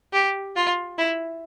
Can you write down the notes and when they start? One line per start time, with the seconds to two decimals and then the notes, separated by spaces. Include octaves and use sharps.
0.13 G4
0.56 F4
0.98 E4